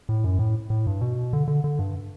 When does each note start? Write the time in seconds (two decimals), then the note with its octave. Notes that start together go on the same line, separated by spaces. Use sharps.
0.09 A2
0.24 F#2
0.39 A2
0.70 A2
0.87 G2
1.01 B2
1.33 D3
1.48 D3
1.64 D3
1.79 G2